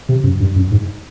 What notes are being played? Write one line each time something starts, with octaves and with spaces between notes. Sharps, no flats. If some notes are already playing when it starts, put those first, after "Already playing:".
C3
F#2
G2
F#2
G#2